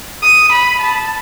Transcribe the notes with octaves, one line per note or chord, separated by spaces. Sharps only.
D#6
B5
A5